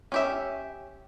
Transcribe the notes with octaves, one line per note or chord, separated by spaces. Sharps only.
C#4 G4 E5